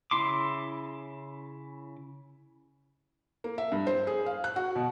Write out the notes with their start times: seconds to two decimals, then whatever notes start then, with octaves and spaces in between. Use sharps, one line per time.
0.11 C#3 C#4 E4 C6 D6
3.44 A#3
3.58 E5
3.72 G2
3.87 C5
4.07 G#4
4.26 F5
4.44 F#6
4.56 F#4
4.76 B2